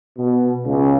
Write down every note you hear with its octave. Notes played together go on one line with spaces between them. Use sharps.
B2
C#2 C#3